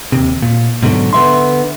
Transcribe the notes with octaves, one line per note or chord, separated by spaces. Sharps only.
D#2 C3
A#2
G#2 B2 D3 F#3
D3 B3 E5 C6